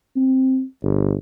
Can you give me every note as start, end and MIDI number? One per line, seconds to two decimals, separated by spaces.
0.16 0.63 60
0.83 1.15 31